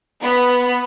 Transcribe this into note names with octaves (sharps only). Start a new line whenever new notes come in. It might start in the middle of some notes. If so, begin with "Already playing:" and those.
B3